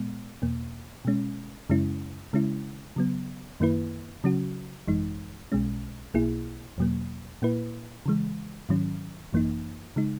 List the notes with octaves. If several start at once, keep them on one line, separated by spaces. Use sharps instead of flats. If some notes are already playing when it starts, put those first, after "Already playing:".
Already playing: A#2 G#3 B3
E2 B2 A#3
B2 G#3 C#4
F#2 C#3 G#3 C#4 E4
C#3 G#3 C#4 E4
C#3 F#3 B3
F#2 D#3 A#3 E4 B4
C#3 F#3 C#4 F#4
G#1 F#2 E3 G#3 D#4
B1 B2 G#3 C#4
B1 B2 A#3 E4 G#4
E2 B2 F#3 A#3
A#2 A#3 E4 B4
C#3 E3 G#3
G#2 D#3 F#3 C#4
G#1 F#2 E3 A#3 D#4
C#3 G#3 D#4